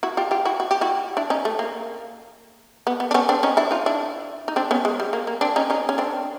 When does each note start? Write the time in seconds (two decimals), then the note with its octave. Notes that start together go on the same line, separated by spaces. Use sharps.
0.03 E4 F#4
0.17 F4 G4
0.31 F4 G4
0.45 E4 F#4
0.60 F#4
0.71 G4
0.81 E4 F#4
1.17 D4 E4
1.30 C#4 D#4
1.45 A3
1.59 A#3
2.87 B3
3.00 B3
3.11 D4
3.14 B3 C#4
3.29 C4 D4
3.43 C#4 D#4
3.57 D4 E4
3.71 D#4 F4
3.86 D4 E4
4.48 D#4
4.56 C4 D4
4.71 B3 C#4
4.85 G#3
5.00 G3
5.13 A#3
5.27 A#3
5.41 C4 D4
5.56 C#4 D#4
5.70 C#4 D#4
5.89 C#4
5.98 C4 D4